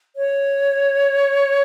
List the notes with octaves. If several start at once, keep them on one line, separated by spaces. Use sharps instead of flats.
C#5